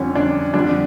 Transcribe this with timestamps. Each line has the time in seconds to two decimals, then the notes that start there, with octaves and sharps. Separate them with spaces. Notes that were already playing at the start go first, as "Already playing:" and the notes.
Already playing: F2 D3 G3 C#4
0.15 D4
0.54 F2 D3 G3 D4